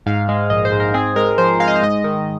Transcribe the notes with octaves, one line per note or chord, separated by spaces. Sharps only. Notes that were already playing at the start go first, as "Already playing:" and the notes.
G#2 F5
G#3
A#1 D#5
C5
G#2
A#4
C4 G#4
G#3 A#4
F3 C5
G#3 F5
D#5
C5
G#2 D#5
D#3